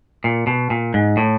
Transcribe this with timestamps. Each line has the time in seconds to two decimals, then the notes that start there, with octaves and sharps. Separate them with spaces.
0.24 A#2
0.47 B2
0.70 A#2
0.94 G#2
1.17 A2